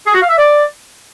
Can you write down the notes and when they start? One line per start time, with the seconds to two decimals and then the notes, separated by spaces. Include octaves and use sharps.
0.06 G#4
0.14 F#4
0.22 F5
0.29 E5
0.37 D5